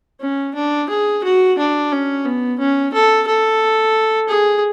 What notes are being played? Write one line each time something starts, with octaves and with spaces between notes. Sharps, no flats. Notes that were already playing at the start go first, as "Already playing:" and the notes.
C#4
D4
G#4
F#4
D4
C#4
B3
C#4
A4
A4
G#4